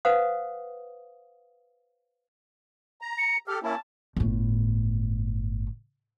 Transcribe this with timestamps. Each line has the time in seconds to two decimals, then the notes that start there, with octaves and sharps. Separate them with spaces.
0.05 B4 C5 F5 F#5 D#6
3.01 A#5
3.18 C#7
3.47 G4 A4 F6
3.63 A#3 C#4 E4 A5
4.16 G1 A2